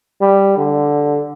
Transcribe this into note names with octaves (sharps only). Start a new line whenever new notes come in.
G3
D3